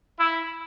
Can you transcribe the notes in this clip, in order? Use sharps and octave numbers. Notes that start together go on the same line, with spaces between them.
E4